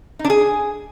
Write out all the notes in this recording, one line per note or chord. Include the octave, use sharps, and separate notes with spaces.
D#4
D4
G#4